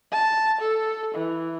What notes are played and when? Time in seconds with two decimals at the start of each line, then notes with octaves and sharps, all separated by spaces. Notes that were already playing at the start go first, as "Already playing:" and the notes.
0.12 A5
0.61 A4
1.15 E3